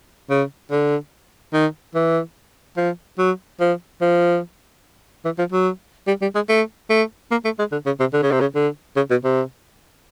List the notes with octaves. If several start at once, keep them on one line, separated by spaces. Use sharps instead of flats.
C#3
D3
D#3
E3
F3
F#3
F3
F3
E3
F3
F#3
G3
G3
G#3
A3
A3
A#3
A3
G#3
D3
C#3
C3
D3
C#3
C3
C#3
D3
C#3
B2
C3